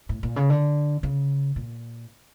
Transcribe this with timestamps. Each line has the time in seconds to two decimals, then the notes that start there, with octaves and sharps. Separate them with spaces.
0.09 A2
0.23 A#2
0.36 C#3
0.50 D3
1.03 C#3
1.56 A#2